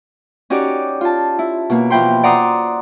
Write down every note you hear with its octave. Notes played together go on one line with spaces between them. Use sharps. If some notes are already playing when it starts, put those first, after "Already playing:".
C#4 D#4 F#4 G4 D5
F4 A5
E4
B2 A#3
B2 E3 F3 G5 B5 C6
D5 F#5 A#5 C6 D#6